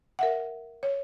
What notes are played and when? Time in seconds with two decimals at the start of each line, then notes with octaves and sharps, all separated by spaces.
0.19 A#4 E5 F#5
0.83 C#5